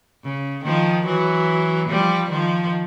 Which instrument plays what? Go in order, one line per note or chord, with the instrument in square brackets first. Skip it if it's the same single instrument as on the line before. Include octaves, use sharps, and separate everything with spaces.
[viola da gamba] C#3
D#3 F3
E3 F#3
F3 G3
D#3 F3